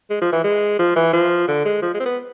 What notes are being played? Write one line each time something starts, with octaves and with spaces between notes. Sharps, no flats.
G#3
F3
E3
G#3
F3
E3
F3
D3
G#3
F3
G#3
C4
B3